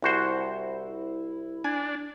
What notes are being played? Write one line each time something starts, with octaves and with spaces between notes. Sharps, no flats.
C2 E4 F#4 C5
D4 G#5